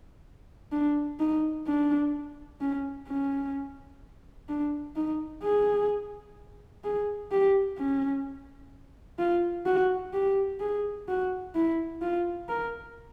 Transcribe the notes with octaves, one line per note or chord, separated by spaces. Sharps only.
D4
D#4
D4
C#4
C#4
D4
D#4
G#4
G#4
G4
C#4
F4
F#4
G4
G#4
F#4
E4
F4
A#4